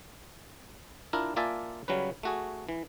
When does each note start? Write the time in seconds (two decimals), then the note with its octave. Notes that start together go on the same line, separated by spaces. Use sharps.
1.13 D4 E4 F4 A#4
1.36 A#3 F4 D5 E5 G#5 A5
1.88 C#3 F#3 G3 C#4 B4
2.23 A3 F#4 G#4
2.69 E3